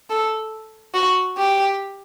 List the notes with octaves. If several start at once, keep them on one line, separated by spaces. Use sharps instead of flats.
A4
F#4
G4